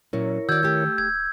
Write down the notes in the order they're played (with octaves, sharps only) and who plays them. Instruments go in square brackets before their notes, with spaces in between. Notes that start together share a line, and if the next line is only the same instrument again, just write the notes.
[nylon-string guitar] A#2 F#3 C#4 [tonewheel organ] E4 A#4 C#5
[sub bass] D#3 [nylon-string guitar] F#4 D5 [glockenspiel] E6 G6 G#6
[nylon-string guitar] A3 G4
[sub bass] D1 [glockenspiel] G#6